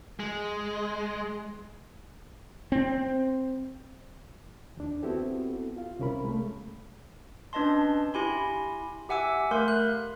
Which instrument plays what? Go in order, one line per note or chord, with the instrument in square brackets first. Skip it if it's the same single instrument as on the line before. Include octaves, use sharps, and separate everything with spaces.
[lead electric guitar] G#3
[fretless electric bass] C4
[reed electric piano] D#2 D4
B3 C4 E4 F#4 G4 A4
F4 F5
C2 C3 C#4 A#4 B5
G#3 A3
[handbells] C#4 D4 B4 D#5 A5 C6
E4 G4 G#5 B5 C6
G4 E5 F#5 G#5 D6 E6
A3 A#4 F5 C6 G6
F#6